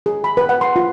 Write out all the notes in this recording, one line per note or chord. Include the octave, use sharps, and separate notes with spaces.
G#4
B5
B4
F#5
C6
F4